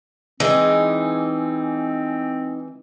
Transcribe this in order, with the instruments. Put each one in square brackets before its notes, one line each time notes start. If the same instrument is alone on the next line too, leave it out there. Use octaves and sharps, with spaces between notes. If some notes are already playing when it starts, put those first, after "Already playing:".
[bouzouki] E3 G#3 [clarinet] C4 [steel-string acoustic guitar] D#4